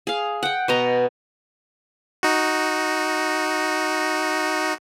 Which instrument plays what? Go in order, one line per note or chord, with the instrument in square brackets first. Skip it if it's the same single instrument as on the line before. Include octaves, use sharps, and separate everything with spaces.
[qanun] G#4 F5
F#5 G5
B2 D#5 A#5
[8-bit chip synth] D#4 F#4